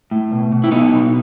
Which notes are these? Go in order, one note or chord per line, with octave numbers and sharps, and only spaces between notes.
A2
B2
B2
E4
B2 B3 D#4
B2